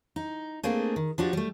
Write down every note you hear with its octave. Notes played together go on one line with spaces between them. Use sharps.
D#4
A3 A#3 C4 D4 G#4
D#3
F3 D4 F#4 G4
G3 A3